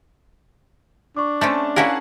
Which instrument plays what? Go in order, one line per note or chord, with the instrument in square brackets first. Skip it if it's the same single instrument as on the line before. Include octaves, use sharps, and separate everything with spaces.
[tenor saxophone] D4 [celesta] C#6 D6
[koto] A3 C4 C#4 [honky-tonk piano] A5
[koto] C#4 E4 A#4 [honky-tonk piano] G#4 F#5 A5 [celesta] F5